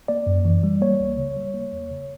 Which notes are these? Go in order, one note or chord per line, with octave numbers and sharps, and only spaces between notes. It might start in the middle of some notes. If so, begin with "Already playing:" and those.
A#3 D5
F#2
E3
G3
A#3 C#5
C#2
C#3
G3
A#3
E2
C#3